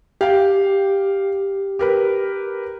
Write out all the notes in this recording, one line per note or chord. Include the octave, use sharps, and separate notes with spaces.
G4 F5 G5
G4 A#4 B4